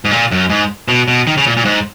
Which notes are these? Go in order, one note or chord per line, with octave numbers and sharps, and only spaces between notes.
G#2
A#2
F#2
G#2
B2
B2
D#3
C#3
A#2
A#2
G#2